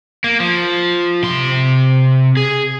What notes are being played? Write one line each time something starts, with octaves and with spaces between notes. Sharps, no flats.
A#3
F3
C3 C6
G#4